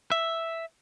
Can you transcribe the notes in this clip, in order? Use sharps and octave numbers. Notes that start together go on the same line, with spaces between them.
E5